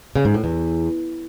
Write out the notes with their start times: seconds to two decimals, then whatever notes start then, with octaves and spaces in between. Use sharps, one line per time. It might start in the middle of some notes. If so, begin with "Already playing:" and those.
0.16 C#3
0.25 G#2
0.34 A2
0.44 E2